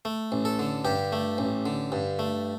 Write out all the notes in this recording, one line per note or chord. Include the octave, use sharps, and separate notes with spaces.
A3
A1
A4
D3
G2 G4
A3
A1
D3
G2
A3